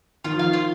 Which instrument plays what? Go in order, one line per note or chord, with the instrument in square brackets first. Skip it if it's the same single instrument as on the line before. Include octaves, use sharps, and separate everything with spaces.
[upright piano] D#3 [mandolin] F4
[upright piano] F3
[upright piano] D#3 [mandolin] F5
[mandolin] F4